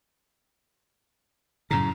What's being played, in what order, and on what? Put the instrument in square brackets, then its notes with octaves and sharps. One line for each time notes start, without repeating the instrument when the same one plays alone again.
[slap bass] F#2 A2 C#3 [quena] A#5